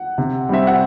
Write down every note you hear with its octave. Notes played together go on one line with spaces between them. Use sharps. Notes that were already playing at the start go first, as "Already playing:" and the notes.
Already playing: F#5
C3
G3 C4 E5
F#5